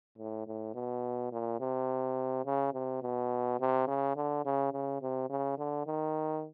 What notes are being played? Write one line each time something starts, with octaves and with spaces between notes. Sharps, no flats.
A2
A2
B2
A#2
C3
C#3
C3
B2
C3
C#3
D3
C#3
C#3
C3
C#3
D3
D#3